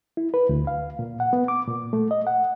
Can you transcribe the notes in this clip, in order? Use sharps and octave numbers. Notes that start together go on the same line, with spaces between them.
E4
B4
D2
F5
A#2
F#5
B3
D6
A#2
A3
D#5
F#5